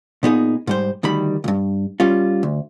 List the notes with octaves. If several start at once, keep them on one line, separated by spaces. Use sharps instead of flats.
A#2 B3 D#4 G#4
G#2 G3 C5
D2 D#3 G3 B5
C#2 G2
G3 C#4 F4
D2